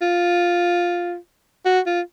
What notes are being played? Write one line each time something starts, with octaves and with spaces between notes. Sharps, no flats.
F4
F#4
F4